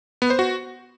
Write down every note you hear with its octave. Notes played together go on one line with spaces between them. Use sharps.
B3
C5
F#4